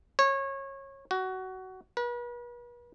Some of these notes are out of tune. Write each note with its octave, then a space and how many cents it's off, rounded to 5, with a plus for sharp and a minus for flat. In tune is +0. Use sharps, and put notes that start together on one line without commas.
C#5 -25
F#4 +20
B4 -40